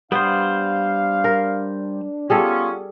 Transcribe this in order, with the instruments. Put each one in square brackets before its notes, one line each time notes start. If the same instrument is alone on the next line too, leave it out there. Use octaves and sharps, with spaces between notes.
[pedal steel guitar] G3 C5 [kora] B3 [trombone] D4 [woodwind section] F5
[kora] A#4
[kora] G3 G#4 A4 [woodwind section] B3 C#4 [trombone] F4